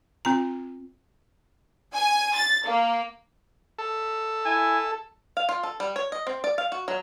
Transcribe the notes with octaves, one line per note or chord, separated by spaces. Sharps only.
C4 F4 A#5
G#5
A6
A#3
A4
E4 G#5
F5
F4
A4
G3
C#5
D#5
C4
D5
F5
F#4
F#3